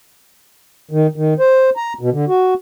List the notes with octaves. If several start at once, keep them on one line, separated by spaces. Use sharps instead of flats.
D#3
D#3
C5
A#5
B2
D3
F#4